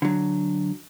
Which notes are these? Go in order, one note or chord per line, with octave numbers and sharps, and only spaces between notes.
D3 F#3